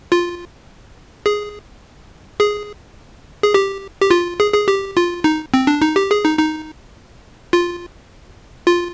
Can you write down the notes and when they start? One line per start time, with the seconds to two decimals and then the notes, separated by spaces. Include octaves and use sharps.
0.12 F4
1.26 G#4
2.40 G#4
3.42 G#4
3.54 G4
4.01 G4
4.10 F4
4.40 G#4
4.54 G#4
4.68 G4
4.97 F4
5.24 D#4
5.54 C4
5.67 D4
5.82 D#4
5.96 G4
6.11 G#4
6.24 D#4
6.38 D#4
7.53 F4
8.66 F4